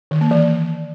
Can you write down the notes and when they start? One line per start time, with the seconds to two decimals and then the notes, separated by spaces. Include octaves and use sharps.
0.11 D#3
0.21 A#3
0.31 E3